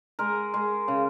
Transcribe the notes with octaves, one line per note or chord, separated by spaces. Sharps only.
G#3 A#4
G#3
C#3